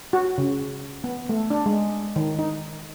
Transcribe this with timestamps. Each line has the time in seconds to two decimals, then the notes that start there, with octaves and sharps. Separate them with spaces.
0.13 F#4
0.38 C#3
1.04 B3
1.29 A3
1.50 D4
1.66 G#3
2.16 D#3
2.39 D#4